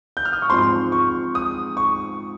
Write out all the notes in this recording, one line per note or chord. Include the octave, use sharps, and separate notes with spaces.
G6
F6
D#6
C#6
G#2 F3 G#3 C4 C6
C#6
D#6
C#6